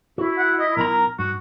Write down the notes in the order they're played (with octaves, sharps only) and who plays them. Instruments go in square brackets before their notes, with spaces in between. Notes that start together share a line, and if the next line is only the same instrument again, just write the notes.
[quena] E4 [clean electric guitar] F#4
[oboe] F#5
D#5
[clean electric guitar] B1 A#5 [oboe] A#4
[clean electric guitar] G2 [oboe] F#4